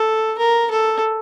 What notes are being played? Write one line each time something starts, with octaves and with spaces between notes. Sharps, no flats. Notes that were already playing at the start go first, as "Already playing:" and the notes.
Already playing: A4
A#4
A4